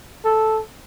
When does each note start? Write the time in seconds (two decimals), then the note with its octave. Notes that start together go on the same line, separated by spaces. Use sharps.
0.25 A4